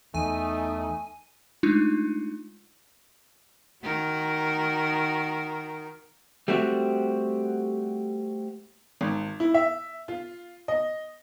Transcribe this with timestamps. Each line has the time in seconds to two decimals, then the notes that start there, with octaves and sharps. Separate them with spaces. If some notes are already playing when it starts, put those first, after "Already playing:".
0.14 E2 A3 D#4 G#5
1.63 G#3 A3 D4 D#4 F4
3.83 D#3 F#4 A#4
6.48 G3 A3 C4 F#4
9.01 G#1
9.40 E4
9.54 E5
10.08 F4
10.68 D#5